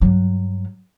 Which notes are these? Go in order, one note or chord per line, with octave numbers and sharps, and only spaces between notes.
G2 F#3